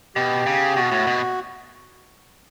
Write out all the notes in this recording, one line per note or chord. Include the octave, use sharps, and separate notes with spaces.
B2 G4
C#3
B2 F#4
A2
B2